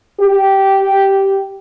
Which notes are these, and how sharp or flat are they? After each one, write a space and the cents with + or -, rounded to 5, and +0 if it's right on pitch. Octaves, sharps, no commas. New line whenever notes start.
G4 -10